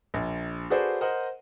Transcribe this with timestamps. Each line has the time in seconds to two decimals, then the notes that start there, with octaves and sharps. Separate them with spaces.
0.14 A#1
0.70 F#4 G#4 A4 B4 C5 D5
1.01 A#4 C5 D#5 F#5